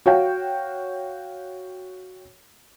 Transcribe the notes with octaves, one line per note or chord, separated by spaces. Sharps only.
F#4 C#5 F5 G5